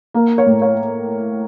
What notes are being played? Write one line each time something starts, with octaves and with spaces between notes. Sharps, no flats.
A#3 A#4
C#5
A2
C#5